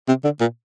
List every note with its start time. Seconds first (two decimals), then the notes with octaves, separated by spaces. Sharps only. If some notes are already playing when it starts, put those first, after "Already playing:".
0.08 C3
0.24 D3
0.41 A#2